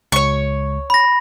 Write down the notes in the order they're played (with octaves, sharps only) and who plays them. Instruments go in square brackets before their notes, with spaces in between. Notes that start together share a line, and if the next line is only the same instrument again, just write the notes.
[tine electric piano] C#2 [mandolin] C#5 C#6
[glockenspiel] B5 A#6